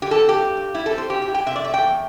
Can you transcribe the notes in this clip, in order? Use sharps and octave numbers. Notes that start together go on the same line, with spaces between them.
D3 G4
A4
C4
G4
G2
G2
G3 E4
A4
C4
C5
G2 G4
G4
E4
G5
C3 E5
D5
A3 E5
G5
E2